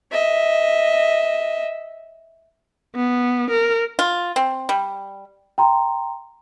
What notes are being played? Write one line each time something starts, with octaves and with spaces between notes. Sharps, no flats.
D#5 E5
B3
A#4
F4
C4
G3
G5 A#5 C6